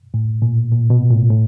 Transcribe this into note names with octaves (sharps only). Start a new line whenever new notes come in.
A2
A#2
A#2
B2
A2
A2